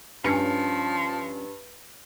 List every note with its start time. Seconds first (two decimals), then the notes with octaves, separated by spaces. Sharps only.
0.24 G2 F3 C#4 C#7